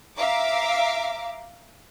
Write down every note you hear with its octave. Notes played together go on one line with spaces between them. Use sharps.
E5 F5 A#5 D6